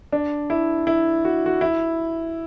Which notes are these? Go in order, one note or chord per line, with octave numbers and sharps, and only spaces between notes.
D4
E4
E4
F#4
F#4
E4